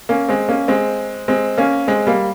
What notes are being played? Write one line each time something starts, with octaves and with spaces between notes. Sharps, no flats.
A#3 C#4
G#3 C4
A#3 C#4
G#3 C4
G#3 C4
A#3 C#4
G#3 C4
G3 A#3